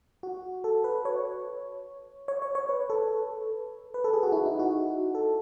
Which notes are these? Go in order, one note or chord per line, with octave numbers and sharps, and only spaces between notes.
F#4
A4
B4
C#5
C#5
C#5
C#5
B4
A4
B4
A4
G#4
F#4
E4
D#4
F#4
A4